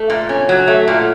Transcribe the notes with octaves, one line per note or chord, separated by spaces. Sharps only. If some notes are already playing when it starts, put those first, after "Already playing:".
Already playing: A3
A#2
C#4
F#3
A3
A#2